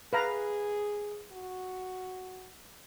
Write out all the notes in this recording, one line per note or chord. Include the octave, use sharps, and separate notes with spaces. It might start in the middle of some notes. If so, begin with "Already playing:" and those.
G#4 B4 F5 A#5
F#4